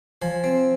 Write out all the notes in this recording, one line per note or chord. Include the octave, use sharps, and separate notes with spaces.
F3 G#5
C4